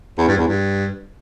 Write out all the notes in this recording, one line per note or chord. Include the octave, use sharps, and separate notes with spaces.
E2
G2
E2
G2